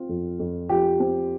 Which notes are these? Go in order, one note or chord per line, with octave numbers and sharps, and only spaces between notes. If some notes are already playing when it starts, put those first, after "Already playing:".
Already playing: C4 F4
F2
F2
F3 G4
C4